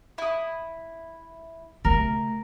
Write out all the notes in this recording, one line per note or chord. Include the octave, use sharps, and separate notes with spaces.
E4 D#6
C#3 A3 A#4